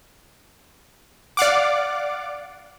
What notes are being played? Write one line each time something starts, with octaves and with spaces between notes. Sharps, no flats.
D5 F5 F#5 D6